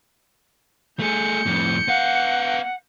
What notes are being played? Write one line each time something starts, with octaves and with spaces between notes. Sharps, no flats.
A3 G#4 G6 C#7
F2 A2
B3 F5 F#5